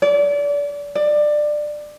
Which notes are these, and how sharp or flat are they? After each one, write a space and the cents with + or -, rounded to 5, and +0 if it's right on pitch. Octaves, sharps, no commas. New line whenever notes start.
D5 -30
D5 +20